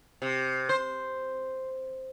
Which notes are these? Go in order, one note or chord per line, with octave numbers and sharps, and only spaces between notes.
C3
C5